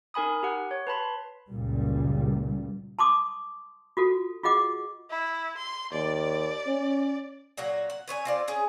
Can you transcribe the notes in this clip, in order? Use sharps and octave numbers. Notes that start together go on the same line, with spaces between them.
D#4 A#4 G#5 B5 D#6
G4 F#5
C#5
B4 A5 B5 C6
F#1 C#2 A#2 G3
A5 C6 D6 D#6
F4 F#4 A4
F4 G#4 D#5 F#5 D6
E4
C6
D#2 D5
C#4
A#2 F#3 A#3 F#4
F#5
B4 C#5 D5 G#5
C4 F4 D5
C#4 G#4